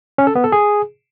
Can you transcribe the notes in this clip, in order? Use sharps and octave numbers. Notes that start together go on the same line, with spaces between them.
C#4
A4
B3
A4
G#4